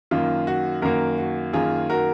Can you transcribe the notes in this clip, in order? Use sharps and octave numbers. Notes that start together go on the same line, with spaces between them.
F#2 D#3 A#3 F4
F#4
F#2 D#3 A#3 F#4 A#4
F#4
F#2 D#3 A#3 F4 G#4
F#4 A#4